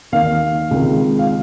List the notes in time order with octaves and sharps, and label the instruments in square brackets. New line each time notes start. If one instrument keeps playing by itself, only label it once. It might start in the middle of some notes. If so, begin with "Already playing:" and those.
[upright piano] D#2 D#3 F5
C#2 C3 D#3
F5